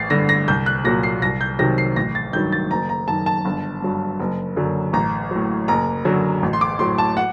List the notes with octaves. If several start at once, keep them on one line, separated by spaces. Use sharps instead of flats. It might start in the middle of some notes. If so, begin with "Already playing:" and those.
Already playing: A1 A6 C7
G2 D3 A#6
A#6
C2 G6
F#6
A#2 F#3 A#6
C7
C2 A#6
G6
C3 D#3 F#3 A#6
C7
A1 A#6
A6
G2 D#3 F#3 G6
A6
F#1 A#5
A#5
F#2 D#3 A5
A5
G1
G2 F#3
F#1
F#2 D3 F#3
A1 A#5
A2 F#3
F#1 A#5
F#2 D3 F#3
A1
C6
D6
A2 F#3 C6
A5
F#5